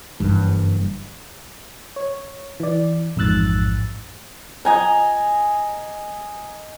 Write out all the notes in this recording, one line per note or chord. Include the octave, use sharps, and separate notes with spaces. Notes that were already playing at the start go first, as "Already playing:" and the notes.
F#1 G2 E3
C#5
E3 D5
A1 F2 G#2 E6 F#6 A6
D#5 G#5 A#5